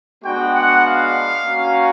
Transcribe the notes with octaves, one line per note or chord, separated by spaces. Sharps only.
G#3 B3 D4 F#4 G5
F#5
F5
A#3 C#4 F#4